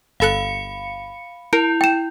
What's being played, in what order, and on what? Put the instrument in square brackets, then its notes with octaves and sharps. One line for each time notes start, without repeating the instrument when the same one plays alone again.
[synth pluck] G1 A4 F#6 [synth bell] F5 B5 C#7
[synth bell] E4 [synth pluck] A#4 [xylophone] D7
[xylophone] G5 E7